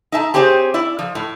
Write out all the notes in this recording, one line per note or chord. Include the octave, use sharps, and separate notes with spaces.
D#4 E5 A5
C4 G4 G#4 C5 C#5
E4 D5
F3
A2